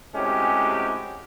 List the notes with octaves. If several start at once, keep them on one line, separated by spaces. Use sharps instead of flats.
A2 C3 G#3 C#4 F#4 G4